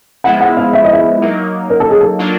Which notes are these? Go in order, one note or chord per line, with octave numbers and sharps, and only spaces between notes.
F3 G#3 B3 E4 F#5
F#5
F5
E5
D#5
E5
F#3 A#3 D#4
A#4
A4
G#4
A4
F#3 A#3 D4 F4